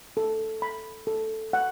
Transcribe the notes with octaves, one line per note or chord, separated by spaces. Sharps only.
A4
B5
A4
F#5